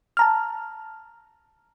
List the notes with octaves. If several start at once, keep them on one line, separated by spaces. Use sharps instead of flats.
A5 A#5 F6